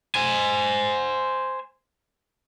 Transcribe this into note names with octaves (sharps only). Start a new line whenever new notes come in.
C5 G#5